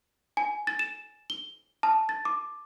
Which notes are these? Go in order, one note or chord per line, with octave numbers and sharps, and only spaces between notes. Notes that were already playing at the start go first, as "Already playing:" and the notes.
G#5
A6
E7
G7
A5
A6
D6